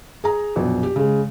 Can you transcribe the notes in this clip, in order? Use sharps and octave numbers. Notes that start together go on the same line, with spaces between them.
G#4 A#5
A#1 F#2 B2
G4
C#3 G#3